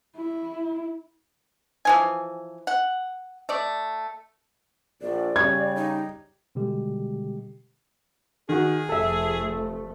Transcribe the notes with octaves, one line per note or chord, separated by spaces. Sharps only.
E4
E3 F3 G#5
F#5
A3 D5
A#1 D5
C#3 G3 G#6
D#4
B2 D3 G3 G#3 G4
D#3 F#4 G#4
F1 F3 A3 A4 E5